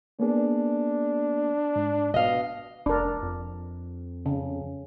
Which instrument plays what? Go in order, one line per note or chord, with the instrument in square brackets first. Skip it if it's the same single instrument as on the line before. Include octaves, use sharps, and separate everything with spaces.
[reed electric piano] A#3 B3 G#4 [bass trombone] D4
[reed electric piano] G#2
[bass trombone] B2 [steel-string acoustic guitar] D#5 F5
[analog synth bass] F1 [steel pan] D4 A#4
[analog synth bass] F2
[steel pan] C#3